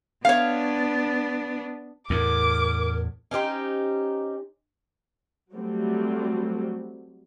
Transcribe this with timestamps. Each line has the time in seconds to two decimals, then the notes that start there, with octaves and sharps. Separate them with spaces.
0.25 B3 D4 C#5 F5
2.10 E2 A2 A#4 D6
3.31 C#4 D#4 G4 C5
5.52 F#3 G3 A3 C4